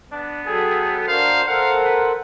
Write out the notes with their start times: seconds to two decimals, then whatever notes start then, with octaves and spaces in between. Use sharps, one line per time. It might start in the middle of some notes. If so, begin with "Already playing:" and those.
0.12 B3 D4
0.47 F#3 G#4 A4 G5
1.08 D4 F#4 A#4 C5 F5
1.48 A4 A#4 C5 F5 F#5
1.85 B4